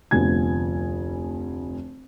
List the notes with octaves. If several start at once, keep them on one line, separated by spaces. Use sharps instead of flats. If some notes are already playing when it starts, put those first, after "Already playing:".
F1 D2 F3 B3 G#5 G#6